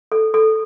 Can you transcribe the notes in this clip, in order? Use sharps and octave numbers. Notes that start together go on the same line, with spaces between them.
A4
A4